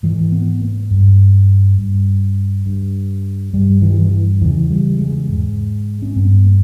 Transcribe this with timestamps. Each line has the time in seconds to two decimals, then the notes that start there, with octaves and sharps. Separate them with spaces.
0.03 G#2 E3
0.32 B3
0.62 A#3
0.91 G2
1.78 G2
2.66 G2
3.53 G2 G3
3.82 E3
3.91 G3
3.99 E3
4.41 E2 C#3 E3
4.70 G3
4.99 G#3
5.29 G#2
6.02 C#4
6.16 G2 B3
6.46 A#3